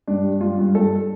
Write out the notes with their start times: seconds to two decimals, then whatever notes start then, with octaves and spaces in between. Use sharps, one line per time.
0.07 G2 D4
0.24 G3
0.41 G2 F4
0.59 G2
0.75 G2 A4